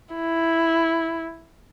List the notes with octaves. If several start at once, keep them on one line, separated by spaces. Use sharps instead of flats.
E4